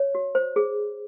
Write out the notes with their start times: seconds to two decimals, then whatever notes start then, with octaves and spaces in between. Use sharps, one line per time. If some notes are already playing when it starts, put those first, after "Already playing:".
Already playing: C#5
0.15 F#4
0.35 C5
0.56 G#4